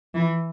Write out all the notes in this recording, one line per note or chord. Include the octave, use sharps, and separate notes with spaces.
E3